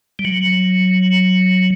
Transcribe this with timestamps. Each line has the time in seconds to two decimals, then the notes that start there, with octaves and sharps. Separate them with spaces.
0.19 G3
0.25 F#3